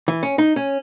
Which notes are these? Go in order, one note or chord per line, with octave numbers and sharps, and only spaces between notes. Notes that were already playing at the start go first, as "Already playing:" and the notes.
E3
C#4
D#4
C#4